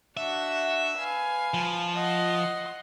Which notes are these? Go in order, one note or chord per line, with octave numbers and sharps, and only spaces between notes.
D4 F#4 E5 F#5
B4 F5 G#5
F3
D#5 F#5 C6